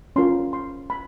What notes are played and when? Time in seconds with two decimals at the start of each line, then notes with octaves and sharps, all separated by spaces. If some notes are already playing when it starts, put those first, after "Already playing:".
0.16 C#4 F4 A#4 C6
0.53 C6
0.90 B5